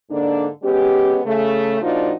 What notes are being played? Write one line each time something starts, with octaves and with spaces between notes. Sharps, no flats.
G#2 D3 A#3 D4
G#3 B3 C#4 G4
C#3 A3
A#2 F3 D4 D#4 F4 F#4